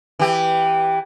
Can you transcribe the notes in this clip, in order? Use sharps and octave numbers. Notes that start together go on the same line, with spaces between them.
E3 G4